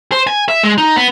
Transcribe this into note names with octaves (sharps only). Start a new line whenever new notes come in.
C5
G#5
E5
G#3
D#4
B3